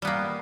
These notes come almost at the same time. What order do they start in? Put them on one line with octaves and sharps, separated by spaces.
G3 B3 A#3